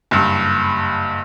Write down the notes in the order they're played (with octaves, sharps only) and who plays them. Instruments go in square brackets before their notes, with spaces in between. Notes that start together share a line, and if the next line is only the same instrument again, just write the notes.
[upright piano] F#1 G2